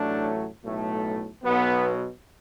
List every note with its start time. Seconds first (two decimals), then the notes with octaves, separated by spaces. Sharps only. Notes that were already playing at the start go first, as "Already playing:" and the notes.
Already playing: A1 A2 F#3 A3 D4
0.62 B1 A2 A3
1.43 B1 B2 F#3 B3